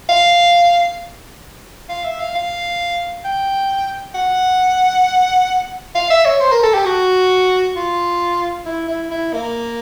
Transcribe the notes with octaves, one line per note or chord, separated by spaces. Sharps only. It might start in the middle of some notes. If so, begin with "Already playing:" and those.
F5
F5
E5
F5
F5
G5
F#5
F5
E5
C#5
C5
A#4
A4
G4
F#4
F4
E4
E4
E4
A#3